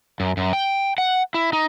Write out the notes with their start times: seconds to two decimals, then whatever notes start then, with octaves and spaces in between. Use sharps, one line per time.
0.20 F#2
0.37 F#2
0.53 G5
0.98 F#5
1.34 E4
1.53 D#4